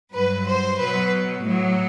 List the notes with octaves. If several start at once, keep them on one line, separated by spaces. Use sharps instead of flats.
G2 F#3 B4
C5
B2 F#3 B4
A2 F#3